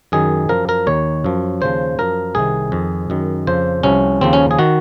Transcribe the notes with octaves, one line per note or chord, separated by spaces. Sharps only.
F#2 D#3 G#4
F#2 F3 A#4
A#4
D#2 D#3 C#5
F#2 F3
D#2 C#3 F3 C5
F#2 F3 A#4
C2 C3 D#3 G#4
F2 D#3
F#2 D#3
F2 C#3 F3 C5
C2 C3 F3 C#4
D#2 C#3 F3 C4
C#4
G#4
D#3 F#4